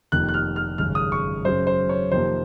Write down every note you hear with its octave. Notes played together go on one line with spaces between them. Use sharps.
F1 F2 D#3 A#3 F#6
F#6
F6
F6
G#1 F#2 C#3 G#3 F6
D#6
C#6
F#2 C#3 F#3 C#4 C5
C5
C#5
F2 C3 D#3 A#3 C5